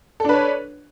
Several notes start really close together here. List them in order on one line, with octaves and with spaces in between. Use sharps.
A4 D4 B4 C#5